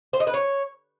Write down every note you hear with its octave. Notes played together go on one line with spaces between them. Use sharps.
C5
D#5
B4
C#5